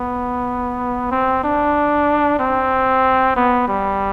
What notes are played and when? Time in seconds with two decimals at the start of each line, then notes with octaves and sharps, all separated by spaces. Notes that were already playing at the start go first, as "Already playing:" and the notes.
Already playing: B3
1.11 C4
1.44 D4
2.39 C4
3.36 B3
3.68 G3